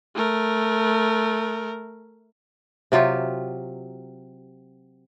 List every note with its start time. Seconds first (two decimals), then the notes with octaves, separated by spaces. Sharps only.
0.15 A3 A#4
2.92 C3 F#3 F4 G4